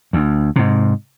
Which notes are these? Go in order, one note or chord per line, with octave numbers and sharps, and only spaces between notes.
D2
G#2 C3